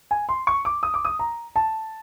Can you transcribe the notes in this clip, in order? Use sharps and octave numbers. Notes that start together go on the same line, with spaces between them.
G#5
C6
C#6
D6
D#6
D6
D#6
A#5
A5